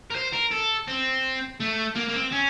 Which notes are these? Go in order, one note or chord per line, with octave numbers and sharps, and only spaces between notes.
A#4
C5
A#4
A4
C4
A3
A#3
A#3
C4
C#4